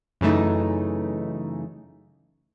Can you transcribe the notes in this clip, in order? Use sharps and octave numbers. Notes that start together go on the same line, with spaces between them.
F#2 C#3 E3 A3 D#4